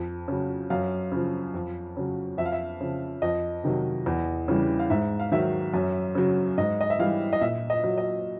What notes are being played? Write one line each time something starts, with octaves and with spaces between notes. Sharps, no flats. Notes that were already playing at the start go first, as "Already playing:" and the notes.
Already playing: F2
C#3 F#3
F#2 F5
C#3 F3
F2
C#3 F#3
F2 E5
F5
E5
C#3 F3
F2 D#5
C3 D#3 F#3
E2
C#3 E3 G3
F5
G#2 E5
F5
D#3 F#3 E5
F#2
C#3 F#3
G#2 D#5
D#5
E5
E3 G3 F5
D#5
A#2 E5
D#5
F#3
D#5